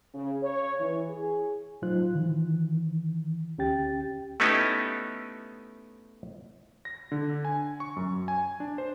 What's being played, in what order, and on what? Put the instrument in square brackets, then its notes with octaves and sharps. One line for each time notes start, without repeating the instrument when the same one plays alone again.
[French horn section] C#3
C#5
E3
G#4
[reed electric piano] A2 F#3 D#4 F4 C5 F#6
D#3 E3
D2 C#4 G4 G5 A6
[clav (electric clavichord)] A3 B3 C#4 D#4 E4 G4
[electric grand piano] A#6
D3
G#5
C#6
F#2
G#5
D4
C5